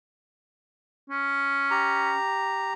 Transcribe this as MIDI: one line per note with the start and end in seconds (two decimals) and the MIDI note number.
1.10 2.14 61
1.71 2.73 67
1.71 2.73 82